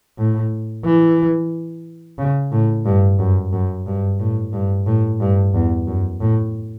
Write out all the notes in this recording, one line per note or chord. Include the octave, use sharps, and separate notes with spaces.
A2
E3
C#3
A2
G2
F#2
F#2
G2
A2
G2
A2
G2
E2
F#2
A2